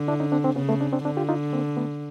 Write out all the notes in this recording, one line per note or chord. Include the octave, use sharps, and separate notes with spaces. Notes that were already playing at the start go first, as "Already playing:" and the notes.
Already playing: D3
D4 E4
C#4 D#4
C4 D4
C4 D4
C#3 B3 C#4
A3 B3
C4 D4
C4 D4
D3 C4 D4
F4 G4
D#4 F4
A#3 C4
A3 B3